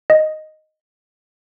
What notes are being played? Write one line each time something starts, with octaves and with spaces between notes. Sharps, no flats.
D#5